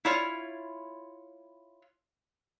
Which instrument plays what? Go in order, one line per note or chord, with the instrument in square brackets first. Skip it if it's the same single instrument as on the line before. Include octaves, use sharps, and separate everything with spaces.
[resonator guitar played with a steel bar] E4 F4 C#5